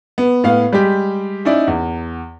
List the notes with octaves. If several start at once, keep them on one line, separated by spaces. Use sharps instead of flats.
B3
A2 B3 F5
G3 G#3 G4
C#4 D#4 E4 D5
E2